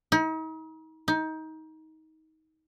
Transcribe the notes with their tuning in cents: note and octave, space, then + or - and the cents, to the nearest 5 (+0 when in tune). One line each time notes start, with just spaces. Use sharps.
D#4 +40
D#4 +25